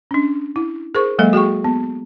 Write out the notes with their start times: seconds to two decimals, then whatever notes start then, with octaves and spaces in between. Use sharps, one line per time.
0.11 C#4 D4
0.56 E4
0.95 G#4 A#4 C5 C#6
1.19 F#3 G#3 A#3 A4 D#5 E5
1.33 F#4 G#4 G5 C#6
1.64 B3